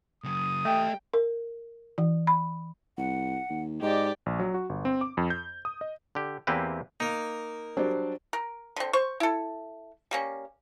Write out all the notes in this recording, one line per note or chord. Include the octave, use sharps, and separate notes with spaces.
C#3 F#3 D#6
A3 G4 D#5 G5
A#4
E3
B5
C2 F#5
D#2
G#2 G4 D5 D#5
A#1
F#3
F#4
G1
C4
D6
F2
G6
D#6
D#5
D3 G4
E2 A#3 C4 E4 G4 B4
A#3 D#4
F#3 G3 D4 C5 D5
A#4
D3 C4
C5 C#6
E4 A4
G3 A#3 C#4